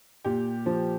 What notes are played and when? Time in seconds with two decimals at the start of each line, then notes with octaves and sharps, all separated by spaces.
0.25 A#2 G4
0.66 F3